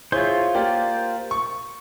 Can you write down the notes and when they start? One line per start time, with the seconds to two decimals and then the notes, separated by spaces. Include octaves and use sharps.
0.12 E4 F4 G#4 C5 C#5
0.54 A#3 G4 D5
1.31 C#6